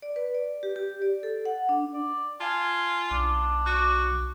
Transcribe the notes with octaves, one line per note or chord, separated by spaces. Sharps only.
D5
B4
D5
G4
G4
D5
A4
F#5
D4
D5
F4 F5 G#5 A5
B1 D4
F#4 D6 F#6